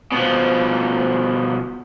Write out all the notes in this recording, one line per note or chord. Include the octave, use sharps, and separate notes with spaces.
B2 F3